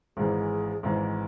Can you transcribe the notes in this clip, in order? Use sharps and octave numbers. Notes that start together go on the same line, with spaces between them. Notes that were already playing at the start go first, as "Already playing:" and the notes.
G#1 G#2 E3 G#4
G#1 G#2 E3